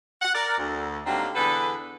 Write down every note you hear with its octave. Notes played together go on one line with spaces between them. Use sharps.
F#5
A#4 D5
D2
D3 F#3 G3 A#3 C4 D#4
E2 D3 G#4 A4 B4